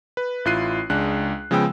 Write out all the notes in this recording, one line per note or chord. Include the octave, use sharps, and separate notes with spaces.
B4
A1 E4 F4 F#6 C7 D#7
C#2 G#3 D4 F#6
C#3 F3 G#3 B3 G5 E6